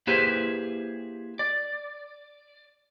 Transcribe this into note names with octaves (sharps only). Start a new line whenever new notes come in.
A#3 E4 G4 G#4 B4 C5
D5